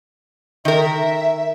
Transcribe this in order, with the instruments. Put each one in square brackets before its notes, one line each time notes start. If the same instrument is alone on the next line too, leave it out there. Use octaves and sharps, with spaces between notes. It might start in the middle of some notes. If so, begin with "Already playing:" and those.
[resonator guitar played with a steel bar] D#3 A#4 [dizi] E5